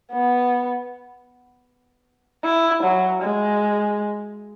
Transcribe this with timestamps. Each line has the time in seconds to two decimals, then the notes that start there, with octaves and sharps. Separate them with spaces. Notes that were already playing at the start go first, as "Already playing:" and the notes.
0.12 B3
2.45 E4
2.84 F#3
3.22 G#3